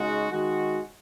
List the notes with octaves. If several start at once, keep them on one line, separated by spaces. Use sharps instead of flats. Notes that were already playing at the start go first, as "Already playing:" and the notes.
Already playing: C#3 G#3 D#4 F#4
D#3 G#3 F#4